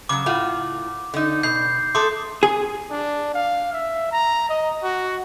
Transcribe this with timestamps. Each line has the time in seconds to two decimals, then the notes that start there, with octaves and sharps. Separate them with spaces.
0.09 C#3 F#3 D6
0.26 A2 F4 F#4
1.14 D3 D#4
1.43 B2 G6 C7
1.95 A3 A4 C6 D6 D#6
2.43 G#4
2.91 D4
3.34 F5
3.73 E5
4.12 A#5
4.50 D#5
4.83 F#4